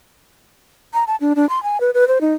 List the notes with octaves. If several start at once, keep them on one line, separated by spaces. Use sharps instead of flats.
A#5
A5
D4
D4
C6
G#5
B4
B4
C5
D#4